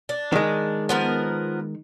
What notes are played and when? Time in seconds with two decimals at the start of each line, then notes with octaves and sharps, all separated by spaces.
0.09 D4
0.32 D#3 G#3
0.89 F3 B3 A#4